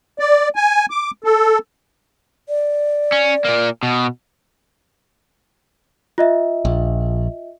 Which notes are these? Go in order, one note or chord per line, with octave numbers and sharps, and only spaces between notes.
D5
G#5
D6
A4
D5
C#4
A#2 A#3
B2
F4 D#5 E5
A#1